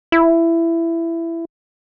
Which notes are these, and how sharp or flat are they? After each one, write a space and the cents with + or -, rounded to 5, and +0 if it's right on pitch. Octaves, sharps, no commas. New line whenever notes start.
E4 +15